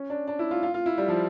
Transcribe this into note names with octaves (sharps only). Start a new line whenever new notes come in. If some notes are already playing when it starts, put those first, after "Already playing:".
Already playing: C#4
D4
D4
E4
F4
F4
F4
E4
G3
F3